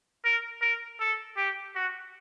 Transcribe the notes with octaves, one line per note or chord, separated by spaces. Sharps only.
A#4
A#4
A4
G4
F#4